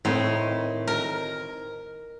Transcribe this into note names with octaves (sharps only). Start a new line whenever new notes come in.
A2 D#3 C4 D#5
A#4